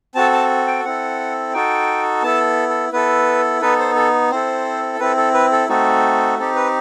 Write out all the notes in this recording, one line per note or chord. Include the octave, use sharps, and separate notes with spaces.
C4 F#4 A4 A5
A5
G5
C4 E4 A4 F#5
D#4 F#4 A4 G5
B3 E4 A4 A5
A4
B3 E4 A4 B4
B3 D#4 A4 B4
C5
A4
C4 E4 A4 C5
C4 E4 A4 B4
A4
B4
A4
A3 C4 D#4 F#4 A4
C4 D#4 G4 A4
B4